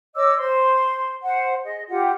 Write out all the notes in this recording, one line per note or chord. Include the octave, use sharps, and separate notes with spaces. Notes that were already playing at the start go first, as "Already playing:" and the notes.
C#5 D#5 D6 E6
C5 C6
C5 F#5
G#4 D#5
F4 G4 F#5